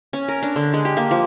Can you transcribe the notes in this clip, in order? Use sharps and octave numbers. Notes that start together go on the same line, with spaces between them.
C#4
A#4
D4
D3
G#3
G4
A#3
F3